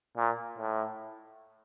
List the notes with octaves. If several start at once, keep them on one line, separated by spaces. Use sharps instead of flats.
A#2
A2